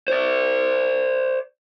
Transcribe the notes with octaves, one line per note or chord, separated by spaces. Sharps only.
C5 D5